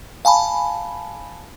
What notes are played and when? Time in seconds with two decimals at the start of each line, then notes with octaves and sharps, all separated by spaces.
0.25 F5 G#5 A5 B5